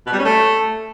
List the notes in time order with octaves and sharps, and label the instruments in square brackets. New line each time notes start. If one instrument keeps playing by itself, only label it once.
[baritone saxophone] B2
G3
C#4
A3